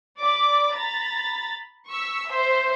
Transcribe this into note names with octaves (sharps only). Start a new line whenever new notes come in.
D5 B5 D6
A#5 B5 A6
C#6 E6 B6
C5 E5